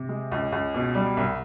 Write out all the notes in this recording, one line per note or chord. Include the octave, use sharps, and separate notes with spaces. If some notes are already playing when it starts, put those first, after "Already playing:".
Already playing: C3
G#3
C#2
C#2
B2
G3
C2